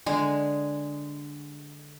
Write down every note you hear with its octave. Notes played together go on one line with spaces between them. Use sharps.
D3 G#3 G#4